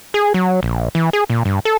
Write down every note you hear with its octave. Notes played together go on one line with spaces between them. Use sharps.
G#4
F#3
A#1
E3
G#4
A#2
G2
A4